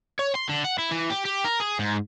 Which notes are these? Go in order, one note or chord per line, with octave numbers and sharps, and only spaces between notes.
C#5
C6
D3
F#5
E4
E3
G4
G4
A#4
G#4
G#2